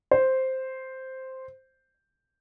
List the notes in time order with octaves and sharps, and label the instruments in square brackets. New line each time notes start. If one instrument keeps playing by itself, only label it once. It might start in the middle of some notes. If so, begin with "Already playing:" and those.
[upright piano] C5